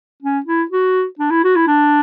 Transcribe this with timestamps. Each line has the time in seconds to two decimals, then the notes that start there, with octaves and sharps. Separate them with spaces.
0.23 C#4
0.46 E4
0.71 F#4
1.19 D4
1.31 E4
1.44 F#4
1.56 E4
1.68 D4